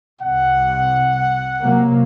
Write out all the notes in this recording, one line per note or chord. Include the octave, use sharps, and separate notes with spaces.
C2 C3 F#5
C3 F#3 A#3